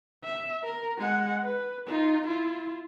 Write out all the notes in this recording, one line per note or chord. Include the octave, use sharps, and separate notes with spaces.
E5
A#4
G#3 F#5
B4
D#4 F4
E4 F4